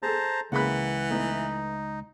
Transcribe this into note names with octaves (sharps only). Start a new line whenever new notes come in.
G#4 A4 C5 A5 A#5
C#2 C#3 E3 A#3 F#5 B5 F#6
A3 B3 D#4 E4